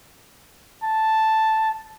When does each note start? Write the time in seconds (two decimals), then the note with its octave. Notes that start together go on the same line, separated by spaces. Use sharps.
0.83 A5